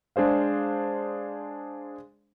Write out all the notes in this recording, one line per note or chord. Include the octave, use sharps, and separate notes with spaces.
G#3 D4 G#4 C5 F5